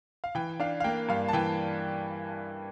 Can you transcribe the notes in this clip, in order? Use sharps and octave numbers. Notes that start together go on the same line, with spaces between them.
F5
E3 G5
D4 F5
F5
A#3 G5
G2 F5
A5
E3 G5